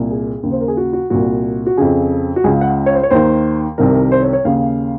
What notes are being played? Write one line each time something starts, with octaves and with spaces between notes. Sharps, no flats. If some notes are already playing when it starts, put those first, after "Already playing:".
Already playing: C2 A#2
G#4
D#2 C#3
C5
A#4
G#4
F#4
F#4
C2 A#2 F#4
F#4
F2 C#3 G#4
F#4
C#2 C#3 G#4
F#5
F5
C#5
C5
C#5
D#2 D#3 C5
C2 C3 D#3 A#4
A#4
C5
C#5
C#5
D#2 C#3 F5